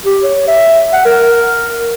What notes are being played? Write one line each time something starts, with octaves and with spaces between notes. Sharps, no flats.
G4
C#5
E5
F#5
A#4